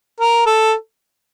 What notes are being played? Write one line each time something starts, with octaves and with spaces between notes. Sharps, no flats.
A#4
A4